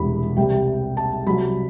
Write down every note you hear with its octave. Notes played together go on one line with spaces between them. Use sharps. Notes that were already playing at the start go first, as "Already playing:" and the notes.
Already playing: E1 E2 C3 E3 G3 B5
C2 C3 G3 G5
A5
C2 C3 F#3 B5